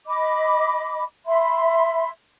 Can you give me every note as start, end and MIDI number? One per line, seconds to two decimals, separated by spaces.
0.08 1.04 75
0.08 1.04 83
0.08 1.04 86
1.26 2.08 76
1.26 2.08 83
1.26 2.08 84